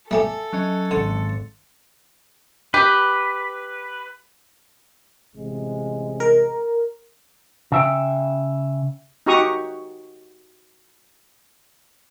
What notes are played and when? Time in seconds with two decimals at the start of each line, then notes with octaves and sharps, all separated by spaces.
0.11 G3 A3 G4 A4 E5 G#5
0.53 F#3 C#4 D#5
0.91 G#1 D3 C6 A6 C#7
2.74 G4 B4
5.35 A1 C3 G#3
6.20 A#4
7.72 C#3 E5 G5
9.26 D#4 F#4 G4 A#5 C#6 D#6